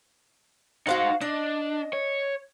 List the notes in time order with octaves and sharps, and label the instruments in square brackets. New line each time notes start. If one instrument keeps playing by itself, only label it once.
[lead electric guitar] D#4 C5 [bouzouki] F#4 F5 F#5
[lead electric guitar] D4 [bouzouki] D#5
[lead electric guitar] C#5